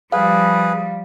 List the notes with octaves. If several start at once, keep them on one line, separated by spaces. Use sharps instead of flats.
F3 G3 G#4 B4 F5